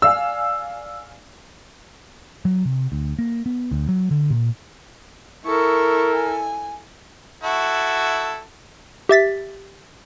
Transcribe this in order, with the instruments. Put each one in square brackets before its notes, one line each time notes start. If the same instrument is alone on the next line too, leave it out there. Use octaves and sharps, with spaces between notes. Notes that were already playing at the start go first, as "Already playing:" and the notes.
[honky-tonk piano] D5 F5 G#5 [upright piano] E6
[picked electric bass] F#3
C3
D2
A#3
B3
D2
F#3
D3
A#2
[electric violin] E4 A4 [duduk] A#4 [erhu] C#6
[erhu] G#5
[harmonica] E4 F#4 A4
[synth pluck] G4 E5 A6 B6